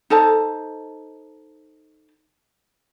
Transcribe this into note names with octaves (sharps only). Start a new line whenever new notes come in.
D#4 A4 C5 A5